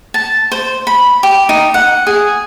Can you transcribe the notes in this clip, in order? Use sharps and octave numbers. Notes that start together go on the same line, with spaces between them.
A5
C5
B5
G4
D#4
F#5
G#4